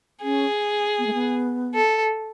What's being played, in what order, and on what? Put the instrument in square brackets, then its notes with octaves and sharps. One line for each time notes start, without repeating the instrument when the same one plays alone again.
[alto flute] C#4 [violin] G#4
[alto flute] B3
A3
B3
[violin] A4